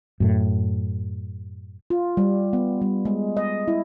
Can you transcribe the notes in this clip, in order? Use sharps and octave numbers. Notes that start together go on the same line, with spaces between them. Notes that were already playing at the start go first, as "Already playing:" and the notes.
F#2 A2
F4
G3
B3
G3
G#3
D#5
E4